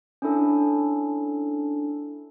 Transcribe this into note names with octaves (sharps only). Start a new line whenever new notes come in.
C#4 D4 E4 A4